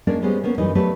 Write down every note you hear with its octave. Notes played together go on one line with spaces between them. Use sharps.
G#3 A#3 C#4 D4 A#4 D5
G3 G#3 B3 C#4 C5
A#3 B3 C#4
F#2 E3 G3 D#4
F#3 A3 B3 D4 G4 B4